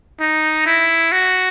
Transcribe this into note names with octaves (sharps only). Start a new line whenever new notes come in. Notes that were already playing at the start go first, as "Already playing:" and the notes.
D#4
E4
F#4